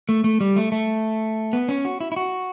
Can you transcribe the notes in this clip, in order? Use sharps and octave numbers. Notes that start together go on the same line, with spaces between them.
A3
A3
G3
A3
A3
B3
C#4
F#4
E4
E4
F#4